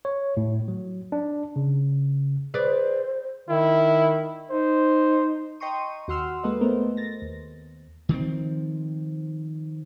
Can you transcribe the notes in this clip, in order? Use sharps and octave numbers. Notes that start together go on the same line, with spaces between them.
C#5
A2
F#3
D4
C#3
G#4 B4 C5 D5
D#3 E4
D#4 C5
D#5 G5 A#5 C6 C#6 D#7
D#2 F#4 F#5 C6 E6 F6
G#3 A#3 A4 B4 D#5
A3 B3 A#4 C5
A6 A#6
D#2
D#3 F3 G#3 C4